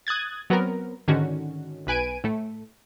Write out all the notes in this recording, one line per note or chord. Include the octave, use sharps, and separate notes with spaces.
D#6 F#6 G#6 A6
F#3 B3 C4 A#4
G#2 D3 D#3 C#4 F#4
B1 B4 G#5 D7 D#7
A2 A3